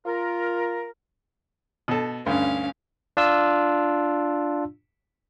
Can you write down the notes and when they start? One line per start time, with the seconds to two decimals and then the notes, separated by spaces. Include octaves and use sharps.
0.06 F4 A#4
1.88 B2 A4
2.26 D2 G2 C#4 F5
3.17 D4 F4 E6